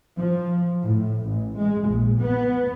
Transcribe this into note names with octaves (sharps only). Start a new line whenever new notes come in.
F3
A2
A1
G#3
A#1
B3